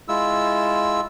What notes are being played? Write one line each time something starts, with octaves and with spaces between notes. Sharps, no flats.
G#3 E4 F4 E6